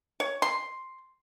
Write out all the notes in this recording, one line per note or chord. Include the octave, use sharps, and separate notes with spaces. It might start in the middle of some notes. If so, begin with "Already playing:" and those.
C#5
C6